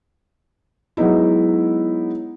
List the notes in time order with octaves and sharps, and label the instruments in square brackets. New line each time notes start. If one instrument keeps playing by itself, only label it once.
[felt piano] F#3 G#3 B3 D#4 E4